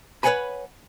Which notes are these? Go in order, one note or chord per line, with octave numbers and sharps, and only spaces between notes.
B4 C#5 F5 F#5 G#5 B5